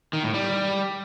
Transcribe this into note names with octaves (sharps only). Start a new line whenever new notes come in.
D#3
A2
G3